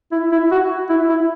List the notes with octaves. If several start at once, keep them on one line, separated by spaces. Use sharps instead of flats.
E4
E4
F#4
E4
E4